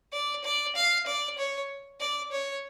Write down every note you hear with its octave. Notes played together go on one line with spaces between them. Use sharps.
D5
D5
F5
D5
C#5
D5
C#5